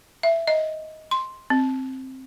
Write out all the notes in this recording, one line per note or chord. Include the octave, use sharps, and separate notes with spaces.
E5
D#5
C6
C4